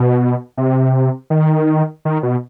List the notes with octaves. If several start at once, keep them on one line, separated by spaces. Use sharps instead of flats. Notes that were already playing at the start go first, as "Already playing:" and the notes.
Already playing: B2
C3
D#3
D#3
B2